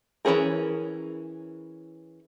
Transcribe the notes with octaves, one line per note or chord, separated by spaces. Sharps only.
E3 C4 C#4 G#4 A#4